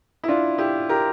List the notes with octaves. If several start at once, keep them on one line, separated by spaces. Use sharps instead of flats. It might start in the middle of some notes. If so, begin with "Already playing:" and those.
E4
D4 F4
E4 G4
G4 A#4